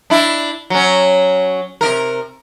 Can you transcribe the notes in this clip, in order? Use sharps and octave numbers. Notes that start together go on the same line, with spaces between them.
D4 E4
F#3 C#4
C3 D#3 A#4